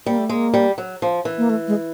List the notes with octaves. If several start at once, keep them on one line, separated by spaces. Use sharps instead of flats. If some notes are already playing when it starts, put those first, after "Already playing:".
G3 A#3
A3
G#3 A#3
G3
F#3
F3
E3
A#3
A3
G#3